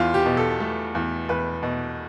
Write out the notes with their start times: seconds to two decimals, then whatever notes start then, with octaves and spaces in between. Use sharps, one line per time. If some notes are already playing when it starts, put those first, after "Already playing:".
Already playing: E2 F4
0.14 G4
0.26 B2
0.37 A4
0.60 A3
0.95 E2
1.29 E2 B4
1.63 B2